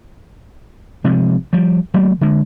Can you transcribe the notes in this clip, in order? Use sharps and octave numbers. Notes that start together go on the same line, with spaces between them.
C3 F3 G#3
F3 G3
F#3 A3 A#3
D3 G#3